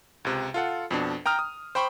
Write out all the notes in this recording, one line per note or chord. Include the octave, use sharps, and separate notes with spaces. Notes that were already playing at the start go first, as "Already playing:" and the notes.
C#2 C3
F4 A4 F#5
F2 B2 D4
G5 A#5 D#6 F6
D#6
C5 G5 B5 C#6